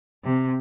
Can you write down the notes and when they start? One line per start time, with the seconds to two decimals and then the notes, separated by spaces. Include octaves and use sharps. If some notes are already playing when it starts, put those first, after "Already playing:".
0.24 C3